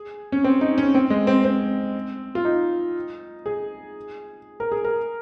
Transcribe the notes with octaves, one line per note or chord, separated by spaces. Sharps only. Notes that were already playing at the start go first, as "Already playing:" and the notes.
Already playing: G#4
C#4
C4
D#4
C#4
C4
G#3
C4
C4
F4
D#4
G#4
A#4
G#4
A#4